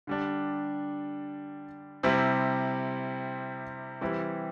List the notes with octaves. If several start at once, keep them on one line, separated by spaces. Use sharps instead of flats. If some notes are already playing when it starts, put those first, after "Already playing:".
D3 G3 D4
C3 G3 C4 E4
E3 G3 C4 E4